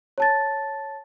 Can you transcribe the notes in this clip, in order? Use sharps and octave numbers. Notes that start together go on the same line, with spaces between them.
C#5 A5 A6